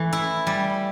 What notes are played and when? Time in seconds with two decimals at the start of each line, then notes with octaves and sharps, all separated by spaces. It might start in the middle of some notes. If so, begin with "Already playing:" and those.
Already playing: E3 A3
0.13 E4
0.47 G3